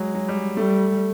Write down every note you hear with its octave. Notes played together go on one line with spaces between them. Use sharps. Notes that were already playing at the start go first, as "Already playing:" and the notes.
Already playing: F#3 G#3
F#3
G3
G3 A3